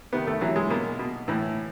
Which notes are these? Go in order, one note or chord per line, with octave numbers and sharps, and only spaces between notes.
C3 D#3 B3
A3
C3 E3 F#3
G#3
B2 A#3
B2
A2 E3